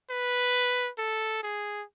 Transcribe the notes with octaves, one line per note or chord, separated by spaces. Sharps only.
B4
A4
G#4